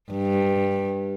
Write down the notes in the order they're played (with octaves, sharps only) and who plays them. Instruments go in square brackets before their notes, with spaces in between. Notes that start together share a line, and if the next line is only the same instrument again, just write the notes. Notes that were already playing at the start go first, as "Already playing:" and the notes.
[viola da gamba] G2